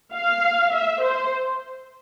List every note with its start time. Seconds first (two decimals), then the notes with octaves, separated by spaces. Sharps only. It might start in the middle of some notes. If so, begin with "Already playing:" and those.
0.14 F5
0.73 E5
1.03 C5